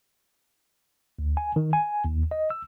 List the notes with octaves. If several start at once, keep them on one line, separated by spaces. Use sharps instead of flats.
D2
G#5
D#3
G#5
D#2
D#5
E6